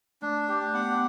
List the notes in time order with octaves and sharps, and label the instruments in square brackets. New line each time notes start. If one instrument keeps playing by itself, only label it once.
[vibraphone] A3 [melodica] D4
[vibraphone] A3 [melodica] G4
[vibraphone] B3 [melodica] F#5